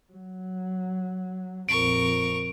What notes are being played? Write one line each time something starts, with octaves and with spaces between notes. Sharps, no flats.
F#3
A#1 F2 A#4 C#6 D7